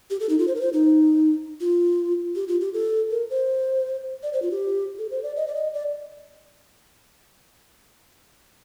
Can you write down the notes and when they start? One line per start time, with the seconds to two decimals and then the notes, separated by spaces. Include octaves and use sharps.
0.10 G4
0.20 A4
0.29 D#4
0.39 F4
0.48 C5
0.55 A#4
0.61 C5
0.73 D#4
1.61 F4
2.36 G4
2.48 F4
2.61 G4
2.73 A4
3.11 A#4
3.30 C5
4.23 D5
4.33 C5
4.42 F4
4.51 G4
4.98 A4
5.11 C5
5.23 D5
5.36 D#5
5.47 D5
5.55 D#5
5.74 D5